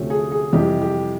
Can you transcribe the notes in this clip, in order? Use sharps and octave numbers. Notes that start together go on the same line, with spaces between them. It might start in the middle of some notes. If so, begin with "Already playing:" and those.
Already playing: D2 C3 F3 A3 C#4
G#4
G#4
F2 C3 E3 G3 G4
G4